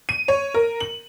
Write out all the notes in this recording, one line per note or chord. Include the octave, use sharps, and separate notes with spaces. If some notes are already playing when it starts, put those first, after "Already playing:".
D#7
C#5
A#4
F#7